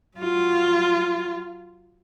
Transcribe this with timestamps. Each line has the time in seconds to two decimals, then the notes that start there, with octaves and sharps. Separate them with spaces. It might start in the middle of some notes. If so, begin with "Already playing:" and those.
0.17 F#3 F4